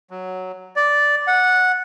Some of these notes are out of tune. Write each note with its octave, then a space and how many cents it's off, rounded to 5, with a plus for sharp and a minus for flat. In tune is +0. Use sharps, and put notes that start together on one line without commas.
F#3 +0
D5 -5
F#5 -10